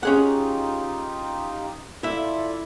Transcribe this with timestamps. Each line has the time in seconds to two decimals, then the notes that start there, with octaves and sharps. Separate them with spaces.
0.03 C#4 D#4 F4 G4 G#4 F#5
2.03 E4 F4 A4 D5 E5